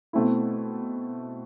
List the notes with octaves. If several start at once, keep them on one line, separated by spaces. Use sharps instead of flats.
B2 A3 C4 E4